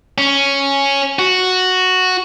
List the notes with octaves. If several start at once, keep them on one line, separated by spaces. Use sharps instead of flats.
C#4
F#4